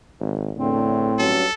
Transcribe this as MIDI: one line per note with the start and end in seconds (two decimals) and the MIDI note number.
0.20 0.51 32
0.57 1.09 40
0.57 1.44 45
0.57 1.09 50
0.57 1.43 60
1.19 1.45 43
1.19 1.45 54
1.19 1.45 61
1.19 1.53 69